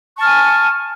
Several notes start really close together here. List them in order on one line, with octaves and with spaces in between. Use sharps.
C#6 A5 F6 G#5